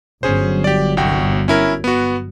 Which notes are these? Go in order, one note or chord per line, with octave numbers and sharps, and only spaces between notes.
G1 F#3 C#4 G#4 C5
G4 D5
C2 F#4 G5
C#4 E4 A#4
B3 F#4